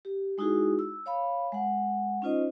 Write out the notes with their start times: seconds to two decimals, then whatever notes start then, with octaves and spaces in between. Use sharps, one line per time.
0.05 G4
0.38 G#3 D#4 E4 F#4 G#4
0.79 E6
1.06 C#5 F5 B5
1.52 G#3 F#5
2.22 C#4 D#4 F4 C5 D#5